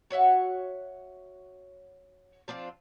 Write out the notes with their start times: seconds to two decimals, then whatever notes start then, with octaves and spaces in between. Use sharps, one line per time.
0.10 F#4 C#5 E5 F#5
2.48 F3 C4 D4 F4